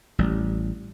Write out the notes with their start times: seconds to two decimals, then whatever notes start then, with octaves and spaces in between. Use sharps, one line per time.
0.18 A1 G3